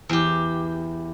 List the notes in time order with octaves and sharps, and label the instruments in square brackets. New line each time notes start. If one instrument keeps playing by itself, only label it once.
[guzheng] E2 G4